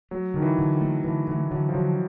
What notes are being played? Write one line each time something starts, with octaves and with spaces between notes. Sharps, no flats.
F#3 A3
D3 D#3
E3
D3
D#3
A3
D3 E3
D3 E3
D3 F#3
F3
D3 F#3